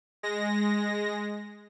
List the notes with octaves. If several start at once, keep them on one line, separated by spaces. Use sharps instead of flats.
G#3 A#6